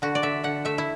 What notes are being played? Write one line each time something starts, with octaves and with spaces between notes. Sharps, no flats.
D3 F#4
D5
D3 E5
D3 F#5
A3 E5
E4